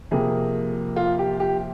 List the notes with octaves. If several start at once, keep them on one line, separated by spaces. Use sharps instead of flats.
F2 C3 F3 A#3 G#4
F4
G4
G4